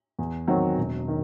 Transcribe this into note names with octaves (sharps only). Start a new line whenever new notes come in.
E2
D#3 F#3 C4 F#4
E1
D#3